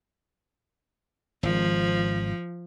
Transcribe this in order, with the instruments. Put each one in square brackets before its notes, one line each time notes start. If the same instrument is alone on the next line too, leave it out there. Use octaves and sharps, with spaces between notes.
[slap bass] G#1 [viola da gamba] F3